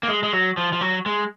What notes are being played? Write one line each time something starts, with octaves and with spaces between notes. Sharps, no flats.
A#3
G#3
G#3
F#3
F3
F3
F#3
G#3